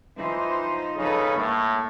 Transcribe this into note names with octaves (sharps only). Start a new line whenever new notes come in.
E3 F3 D#4 C5
C#3 D#4 A4 B4
A2 A#3